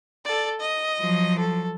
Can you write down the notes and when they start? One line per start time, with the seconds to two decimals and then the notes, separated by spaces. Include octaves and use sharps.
0.24 A4 D5
0.60 D#5
1.00 F3 F#3
1.39 A4